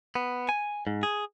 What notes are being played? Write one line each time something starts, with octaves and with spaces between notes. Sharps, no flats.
B3
G#5
G#2
G#4